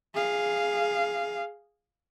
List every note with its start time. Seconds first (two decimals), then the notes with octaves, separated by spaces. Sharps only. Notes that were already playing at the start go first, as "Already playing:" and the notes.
0.14 G#4 F5